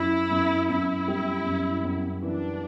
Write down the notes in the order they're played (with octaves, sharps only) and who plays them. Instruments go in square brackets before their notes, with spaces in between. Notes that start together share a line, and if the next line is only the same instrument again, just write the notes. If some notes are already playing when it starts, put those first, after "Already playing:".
Already playing: [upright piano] F#2 [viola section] E4
[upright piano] F#2
[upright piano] F#2 [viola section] E4
[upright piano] G3
F#2
F#2
[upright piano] E3 [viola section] D4